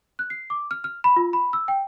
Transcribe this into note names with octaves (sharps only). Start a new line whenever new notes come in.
F#6
C7
D6
F6
F6
B5
F4
B5
E6
G5